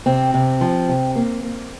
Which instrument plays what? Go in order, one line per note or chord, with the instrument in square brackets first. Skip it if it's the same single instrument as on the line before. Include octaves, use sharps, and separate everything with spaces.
[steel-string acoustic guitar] C3 C4
C3
F3
C3
A#3
A#3